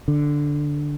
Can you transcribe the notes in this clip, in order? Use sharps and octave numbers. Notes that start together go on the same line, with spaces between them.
D3